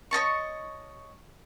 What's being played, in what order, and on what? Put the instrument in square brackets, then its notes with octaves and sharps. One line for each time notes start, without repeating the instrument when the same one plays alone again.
[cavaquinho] C#5 D#5 A5 C#6